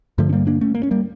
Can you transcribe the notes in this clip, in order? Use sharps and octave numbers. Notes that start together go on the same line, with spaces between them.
G2 D3 F3 A3
C#4
G3 A#3
A#3 D4
A3 C#4
A#3
C#4
G3 A#3